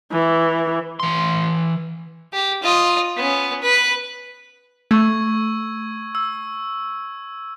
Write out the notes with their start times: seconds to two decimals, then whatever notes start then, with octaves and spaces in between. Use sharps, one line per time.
0.12 E3
1.00 E3 C6
2.33 G4
2.63 F4 D#5
3.17 B3 C#4
3.62 B4
4.91 A3 C#6 E6 G#6
6.15 E6